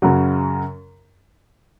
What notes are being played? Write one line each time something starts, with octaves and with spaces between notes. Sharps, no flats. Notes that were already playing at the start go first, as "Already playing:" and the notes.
F#2 C#3 F#3